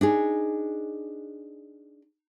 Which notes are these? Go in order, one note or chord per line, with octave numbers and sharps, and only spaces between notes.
D4 D#4 G#4